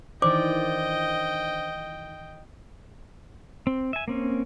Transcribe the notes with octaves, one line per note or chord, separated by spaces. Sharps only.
D#3 E3 D4 C5 D5 D#5 G5 D6
C4
E5 G#5
A#3 C4 C#4